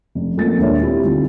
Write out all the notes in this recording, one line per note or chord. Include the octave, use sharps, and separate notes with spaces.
F1
F2 A3 A#3 C4 C#4 A6
D#1 A#2 G#3 D4 C#5 E5
C4 E4 F4 G4
D2 G3 C4 D#4 F4